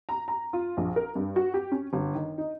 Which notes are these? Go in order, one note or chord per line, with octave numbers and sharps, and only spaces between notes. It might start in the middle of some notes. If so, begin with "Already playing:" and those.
A#5
A#5
F4
A#1
A#4
G2
F#4
G4
C#4
G1
D#3
D#4